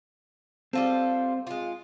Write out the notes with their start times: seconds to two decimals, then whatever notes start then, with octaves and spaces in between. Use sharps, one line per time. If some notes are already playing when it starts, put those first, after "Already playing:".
0.73 G3 C4 F4 A4
1.47 G#3 F4